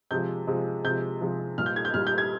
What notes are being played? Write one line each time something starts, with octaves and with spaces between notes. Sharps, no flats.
C3 F3 G#3 G6
C3 F3 G#3
C3 F3 G#3 G6
C3 F3 G#3
A#2 G3 F6
G6
G#6
G6
A#2 G3 F6
G6
G#6